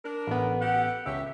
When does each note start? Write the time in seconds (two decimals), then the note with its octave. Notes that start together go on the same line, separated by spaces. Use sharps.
0.05 D4 A#4
0.27 A1 B3
0.61 G4 A4 F#5
1.06 C#2 G4 C#5 E5